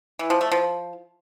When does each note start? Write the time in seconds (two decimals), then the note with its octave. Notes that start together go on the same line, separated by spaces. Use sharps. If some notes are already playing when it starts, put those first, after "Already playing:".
0.19 E3
0.30 F3
0.41 A3
0.52 F3